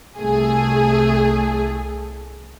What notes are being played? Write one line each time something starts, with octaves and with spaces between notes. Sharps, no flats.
C2 A3 G#4